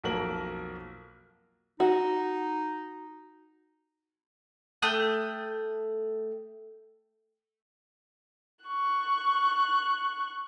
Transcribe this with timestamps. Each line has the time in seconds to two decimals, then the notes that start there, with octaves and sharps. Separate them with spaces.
0.04 B1 F2 A#3 A#4 F#7
1.80 D#4 F#4
4.82 A3 G5 D#6 F#6
8.64 C#6 F#6